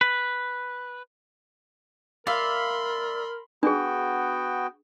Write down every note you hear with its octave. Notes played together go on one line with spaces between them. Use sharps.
B4
A#4 D5 E5 F5 B5 C6
B3 D4 F#4 G#4 G5